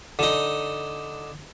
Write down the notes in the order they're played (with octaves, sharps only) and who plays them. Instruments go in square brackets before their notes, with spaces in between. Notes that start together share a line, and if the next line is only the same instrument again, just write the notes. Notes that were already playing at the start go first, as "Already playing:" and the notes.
[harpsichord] D3 D#4